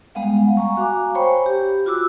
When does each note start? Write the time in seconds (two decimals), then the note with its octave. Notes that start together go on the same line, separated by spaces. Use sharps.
0.15 G3 G#3 B3 F5 F#5
0.57 G#5 A#5 C#6
0.77 F#4 F5 G#5 A#5 D6
1.15 C5 C#5 G5 G#5 B5 C#6
1.46 G4
1.86 F4 F#4 D6 E6